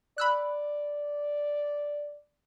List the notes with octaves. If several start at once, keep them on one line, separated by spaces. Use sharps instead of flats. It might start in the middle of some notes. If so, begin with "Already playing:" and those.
D5 B5 E6 F#6